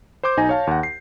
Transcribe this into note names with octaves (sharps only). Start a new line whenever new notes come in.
C5 C6 D6 G6
B1 D#4 G#5 A#6
C#5 F5 A5
D#2 F#5
C7